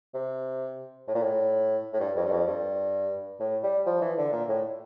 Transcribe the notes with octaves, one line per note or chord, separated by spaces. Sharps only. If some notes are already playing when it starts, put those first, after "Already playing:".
C3
A2
A#2
A2
A2
G2
F2
G2
F2
G2
A2
G3
F3
E3
D3
A#2
A2